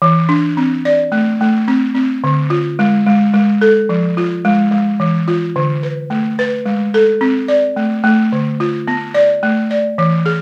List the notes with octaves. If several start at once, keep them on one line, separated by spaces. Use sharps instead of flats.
E3
D4
C4
D5
A3
A3
C4
C4
D3
F4
G#3
G#3
G#3
A4
F3
F4
G#3
G#3
E3
F4
D3
B4
A3
B4
G#3
A4
C4
D5
A3
A3
D3
F4
B3
D5
A3
D5
E3
G#4